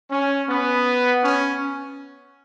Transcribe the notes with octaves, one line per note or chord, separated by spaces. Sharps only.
C#4
B3
C#4